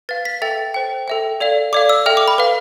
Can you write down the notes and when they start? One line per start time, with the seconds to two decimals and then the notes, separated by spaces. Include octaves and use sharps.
0.09 B4 F5 A6
0.25 B6
0.42 A4 E5 G5 A6
0.74 C5 G5
1.08 A4 E5 G5
1.40 A4 D5 F5
1.73 A4 D5 F5 D6
1.89 E6
2.06 A4 E5 G5 F6
2.17 D6
2.28 B5
2.38 B4 F5